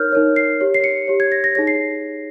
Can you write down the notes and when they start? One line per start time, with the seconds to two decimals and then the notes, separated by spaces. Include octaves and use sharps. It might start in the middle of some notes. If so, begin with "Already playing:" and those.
Already playing: D#4 A#4 C#5 F6 G6
0.12 D#4 A#4 C#5
0.36 C7
0.61 G4 C#5
0.74 C7
0.84 C#7
1.08 G4 C#5
1.20 G#6
1.32 A#6
1.44 A#6
1.55 D#4 G#4 C#5 A#6
1.67 C7